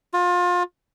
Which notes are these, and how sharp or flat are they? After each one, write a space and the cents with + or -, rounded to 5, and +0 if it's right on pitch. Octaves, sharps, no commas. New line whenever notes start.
F4 +30